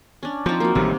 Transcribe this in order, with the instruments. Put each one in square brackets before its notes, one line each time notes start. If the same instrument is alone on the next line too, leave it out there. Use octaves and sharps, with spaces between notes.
[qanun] C#4 D4
[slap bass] F3 [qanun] C4 D#4
[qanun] A#3 F#4
[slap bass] A1 D#3 G3 [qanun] C3